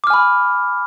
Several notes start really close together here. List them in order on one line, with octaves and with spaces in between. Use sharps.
D6 F6 G#5 B5